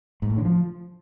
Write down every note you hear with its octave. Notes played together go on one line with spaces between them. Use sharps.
G#2
A2
D3
F3